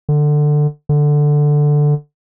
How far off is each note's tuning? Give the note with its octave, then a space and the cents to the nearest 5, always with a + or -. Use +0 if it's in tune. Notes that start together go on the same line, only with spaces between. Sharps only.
D3 +15
D3 +5